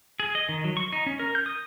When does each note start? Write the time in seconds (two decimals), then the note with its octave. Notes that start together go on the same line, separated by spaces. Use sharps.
0.20 G#4
0.35 D#5
0.49 D#3
0.64 F#3
0.77 C#6
0.92 D#4
1.06 C#4
1.19 A#4
1.35 G6
1.46 D#6